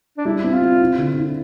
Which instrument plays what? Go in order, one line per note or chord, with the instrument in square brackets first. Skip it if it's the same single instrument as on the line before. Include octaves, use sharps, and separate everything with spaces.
[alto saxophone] D4
[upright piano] G3 [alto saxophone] E4
[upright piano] C4
[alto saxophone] F4
[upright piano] C4
E4
D3
E4